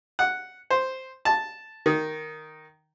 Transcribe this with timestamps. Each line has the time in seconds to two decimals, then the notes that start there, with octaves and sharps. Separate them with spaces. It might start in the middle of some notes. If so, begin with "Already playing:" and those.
0.19 F#5
0.70 C5
1.25 A5
1.86 D#3